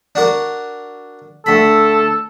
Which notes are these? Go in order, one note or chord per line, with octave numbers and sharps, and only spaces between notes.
D4 F#4 A#4
D2 A4 B5